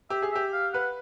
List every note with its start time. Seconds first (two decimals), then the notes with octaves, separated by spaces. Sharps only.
0.10 G4 E5
0.22 G#4
0.32 G4 E5
0.53 F5
0.73 B4 F#5